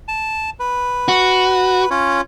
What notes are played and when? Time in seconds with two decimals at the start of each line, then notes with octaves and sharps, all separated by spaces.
0.08 A5
0.60 B4
1.08 F#4
1.91 C#4 F4 C#5